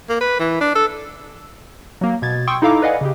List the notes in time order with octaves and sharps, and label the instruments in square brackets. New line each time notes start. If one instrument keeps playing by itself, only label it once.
[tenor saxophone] A#3
B4
E3
D4
A4
[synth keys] F#3 A#3
B2 G#6 A6
G5 C6 C#6 D#6 E6
D#4 E4 A4 F5 A#5 D6
B4 D5 D#5 F5 F#5 G#5
C#3 G4